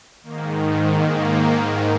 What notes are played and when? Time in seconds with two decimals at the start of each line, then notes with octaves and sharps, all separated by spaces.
0.23 G#2 D#3 A#3
0.92 A#3